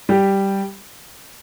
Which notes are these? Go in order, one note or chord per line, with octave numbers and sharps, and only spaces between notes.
G3 G4